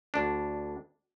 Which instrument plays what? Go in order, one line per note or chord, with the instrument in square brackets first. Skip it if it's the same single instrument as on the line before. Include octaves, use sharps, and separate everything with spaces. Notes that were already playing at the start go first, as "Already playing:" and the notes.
[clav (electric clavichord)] D2 D4